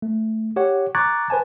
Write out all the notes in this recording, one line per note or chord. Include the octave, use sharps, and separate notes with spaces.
A3
G4 C#5 F#5
A#5 C#6 D6 F#6 G#6 A6
B4 C5 G#5 A5